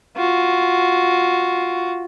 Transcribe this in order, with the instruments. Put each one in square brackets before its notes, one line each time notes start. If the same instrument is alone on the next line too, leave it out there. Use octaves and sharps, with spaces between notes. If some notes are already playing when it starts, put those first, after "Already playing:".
[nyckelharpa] F4 F#4